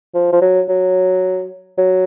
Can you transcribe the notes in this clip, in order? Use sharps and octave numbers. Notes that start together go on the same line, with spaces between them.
F3
F3
F#3
F#3
F#3